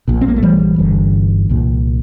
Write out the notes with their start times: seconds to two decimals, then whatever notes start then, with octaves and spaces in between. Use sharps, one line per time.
0.08 A#1 A#2
0.21 C4
0.28 A#3
0.36 A3
0.43 E3 G3
0.78 G1 G2 D3
1.49 C2 A#2